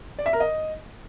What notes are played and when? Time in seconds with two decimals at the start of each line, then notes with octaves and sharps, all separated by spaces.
0.19 D5
0.26 E5
0.33 A#4
0.40 D#5